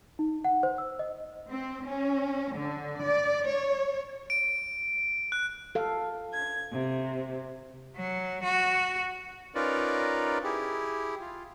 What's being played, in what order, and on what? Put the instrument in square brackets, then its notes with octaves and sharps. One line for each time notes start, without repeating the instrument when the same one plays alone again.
[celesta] D#4
F#5
C5
E6
D#5
[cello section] C4
C#4
D3
D5
C#5
[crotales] D7
F#6
[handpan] A4 F5
[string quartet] G#6
C3
[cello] F#3
F#4
[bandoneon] C#4 D#4 F4 A#4 B4 D5
E4 G4 G#4
F4